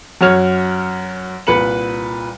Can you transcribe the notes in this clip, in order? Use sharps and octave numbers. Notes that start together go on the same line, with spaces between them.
F#2 F#4 C#5 F6 F7
C2 A#2 B4 B5 C#7 F#7